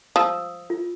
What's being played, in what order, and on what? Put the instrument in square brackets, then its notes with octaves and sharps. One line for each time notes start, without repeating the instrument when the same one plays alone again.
[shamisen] F3 [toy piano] D#6 E6
[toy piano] F4